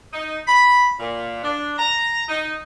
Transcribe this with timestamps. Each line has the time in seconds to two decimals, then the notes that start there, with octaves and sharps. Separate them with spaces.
0.12 D#4
0.48 B5
0.99 A#2
1.42 D4
1.78 A#5
2.29 D#4